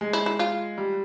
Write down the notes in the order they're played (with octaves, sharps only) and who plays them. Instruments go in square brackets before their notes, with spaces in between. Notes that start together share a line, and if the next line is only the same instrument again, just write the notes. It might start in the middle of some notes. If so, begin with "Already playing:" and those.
[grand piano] G#3
[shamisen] E4
E4
F4
[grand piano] G3